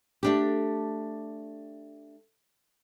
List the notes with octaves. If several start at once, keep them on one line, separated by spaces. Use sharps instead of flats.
A3 D4 G4